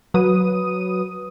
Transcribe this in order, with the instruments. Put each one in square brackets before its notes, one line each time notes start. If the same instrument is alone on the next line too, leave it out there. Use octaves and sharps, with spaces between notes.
[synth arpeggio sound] F#3 B4 D#6 D#7